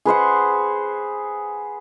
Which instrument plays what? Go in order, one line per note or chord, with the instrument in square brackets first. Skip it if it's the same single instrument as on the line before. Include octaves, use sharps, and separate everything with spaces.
[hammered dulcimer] G#4 B4 C5 F#5